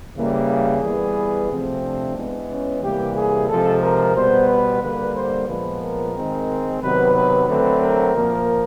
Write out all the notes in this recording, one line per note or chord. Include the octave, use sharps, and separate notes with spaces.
C#3 E3 G3 A#3
G#4
E3 G3 B3
C3 F3 A3 C4
D4
E3 G#3 B3
C#4
C3 E3 G3 A#3 G4
G#4
C3 F3 G#3 A4
A#4
B2 G3 B3 C5
B4
D3 G3 A#3 B4
C5
A#2 F3 G#3 B3 B4
A#4
D#3 G#3 C4
C3 D#3 F#3 B3 B4
B4
D3 F#3 A3 C4 B4
A#4
A#2 F3 A#3